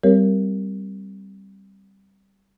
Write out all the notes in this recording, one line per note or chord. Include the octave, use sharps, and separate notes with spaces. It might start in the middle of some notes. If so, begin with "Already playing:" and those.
G3 C4 G4 A#4 C#5